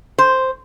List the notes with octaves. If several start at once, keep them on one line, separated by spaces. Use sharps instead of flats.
C5